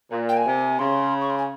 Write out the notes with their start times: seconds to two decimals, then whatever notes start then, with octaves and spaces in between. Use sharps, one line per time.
0.11 A#2
0.29 G5
0.37 G#5
0.46 C3
0.79 C#3 C6
1.21 C#6
1.30 C6
1.38 G#5